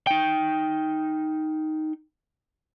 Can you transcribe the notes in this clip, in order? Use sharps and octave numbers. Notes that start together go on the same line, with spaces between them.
D#4 G5